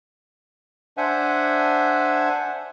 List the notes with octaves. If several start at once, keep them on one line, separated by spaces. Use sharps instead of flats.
D4 C5 E5 F#5 G#5